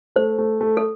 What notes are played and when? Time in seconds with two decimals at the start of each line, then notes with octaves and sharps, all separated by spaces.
0.16 A3 C5
0.38 A3
0.61 A3
0.77 A4